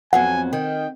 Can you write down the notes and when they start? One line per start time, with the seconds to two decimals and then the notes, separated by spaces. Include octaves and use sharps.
0.13 F2 F#3 B3 F#5 G#5
0.53 D#3 G5